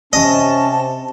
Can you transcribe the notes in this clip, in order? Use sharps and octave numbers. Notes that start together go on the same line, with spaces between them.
C3 C#4 D#5 A5